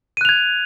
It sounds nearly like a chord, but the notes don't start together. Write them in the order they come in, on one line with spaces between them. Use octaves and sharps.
D#7 F#6 F7 G#6